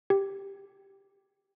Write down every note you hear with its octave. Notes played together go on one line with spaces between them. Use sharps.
G4